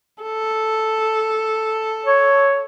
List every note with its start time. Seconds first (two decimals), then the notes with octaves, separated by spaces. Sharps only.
0.22 A4
2.06 C#5